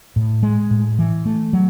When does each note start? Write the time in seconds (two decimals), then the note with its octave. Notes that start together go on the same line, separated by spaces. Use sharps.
0.16 A2
0.43 G#3
0.71 A2
0.99 E3
1.26 A3
1.53 F#3